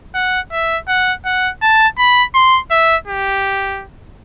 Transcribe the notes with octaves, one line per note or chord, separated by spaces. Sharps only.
F#5
E5
F#5
F#5
A5
B5
C6
E5
G4